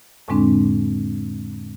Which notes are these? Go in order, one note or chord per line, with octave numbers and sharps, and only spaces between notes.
F2 A2 D3 G#3 C4 D4